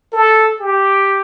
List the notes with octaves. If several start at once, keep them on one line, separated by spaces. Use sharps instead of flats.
A4
G4